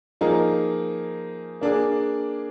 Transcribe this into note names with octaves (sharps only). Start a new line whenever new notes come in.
F3 A#3 D#4 G#4
A#3 D4 G#4